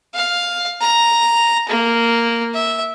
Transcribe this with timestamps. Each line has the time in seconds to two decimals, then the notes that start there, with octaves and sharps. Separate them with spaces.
0.14 F5
0.81 A#5
1.69 A#3
2.55 E5